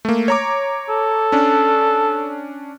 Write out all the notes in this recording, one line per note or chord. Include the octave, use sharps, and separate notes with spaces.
A3 A#3
C#5 A#5 D6
A4
C#4 D4